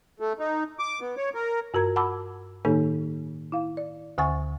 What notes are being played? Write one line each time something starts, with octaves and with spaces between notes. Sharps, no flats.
A3
D#4
D6
B3
C#5
A#4
G2 F#4 A#4 A#5 G#6
F#5 A5 B5 D6 E6
A2 D#3 A#3 D#4 A4
E4 F5
D5
D2 D3 F#5 G#5 C#6 A6